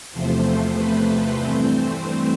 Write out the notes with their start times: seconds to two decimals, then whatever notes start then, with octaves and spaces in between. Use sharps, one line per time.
0.12 E2 C3 F3 A3 C5
0.74 B4
1.34 G2 E3 A3 C4 C5